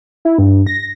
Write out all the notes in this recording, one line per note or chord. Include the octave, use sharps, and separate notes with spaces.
E4
G2
A#6